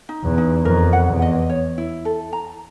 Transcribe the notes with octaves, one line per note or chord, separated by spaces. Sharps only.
D#4
E2
D#4
F2 A#4
F#5
E2
D#5
C#5
E4
A4
A#5